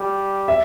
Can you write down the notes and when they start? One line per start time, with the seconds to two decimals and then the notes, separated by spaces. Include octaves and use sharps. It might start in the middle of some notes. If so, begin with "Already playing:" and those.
Already playing: G3
0.48 E5